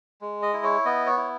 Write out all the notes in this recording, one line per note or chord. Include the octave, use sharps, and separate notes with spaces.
G#3
D#5
E4
C#5
B3 D#5
C#5
E4